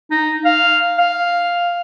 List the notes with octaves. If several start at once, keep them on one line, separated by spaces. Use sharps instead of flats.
D#4
F5
F5